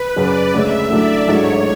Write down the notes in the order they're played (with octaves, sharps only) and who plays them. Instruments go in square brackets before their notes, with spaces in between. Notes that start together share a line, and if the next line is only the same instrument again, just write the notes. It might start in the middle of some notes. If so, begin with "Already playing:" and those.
Already playing: [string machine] B4
[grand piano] F#2 C#3 F#3 C#4 [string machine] D5
[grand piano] D2 C#3 G#3 C#4 [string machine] E5
[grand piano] A2 F#3 A3 D4 [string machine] D5
[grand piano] A1 G#2 F#3 A3 D4 [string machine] C#5